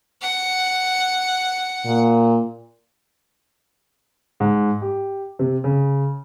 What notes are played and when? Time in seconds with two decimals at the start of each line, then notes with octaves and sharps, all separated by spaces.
0.22 F#5
1.86 A#2
4.40 G#2
4.82 G4
5.39 C3
5.64 C#3